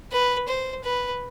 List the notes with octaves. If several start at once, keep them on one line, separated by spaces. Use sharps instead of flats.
B4
C5
B4